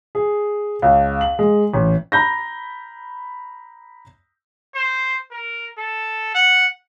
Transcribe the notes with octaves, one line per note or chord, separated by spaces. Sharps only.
G#4
C#2
F#7
G#3
A1
A#5 B5 G6 A#6
C5
A#4
A4
F#5